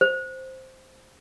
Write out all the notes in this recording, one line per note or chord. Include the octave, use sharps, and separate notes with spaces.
C5